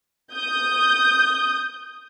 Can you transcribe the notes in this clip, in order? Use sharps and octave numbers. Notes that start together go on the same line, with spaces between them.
D#6 G6